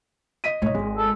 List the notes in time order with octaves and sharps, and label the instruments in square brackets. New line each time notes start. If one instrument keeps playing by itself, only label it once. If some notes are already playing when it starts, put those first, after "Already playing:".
[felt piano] D#5 B6 D#7
[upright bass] A2 D#4 [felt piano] C#5 D#5
[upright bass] G#1 [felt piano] G#3
[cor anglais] A4